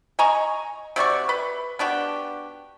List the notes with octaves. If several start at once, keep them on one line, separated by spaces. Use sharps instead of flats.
D#5 G#5 A#5 C#6
C3 F#4 D5 C#6
B4
B3 D4 F#4 G4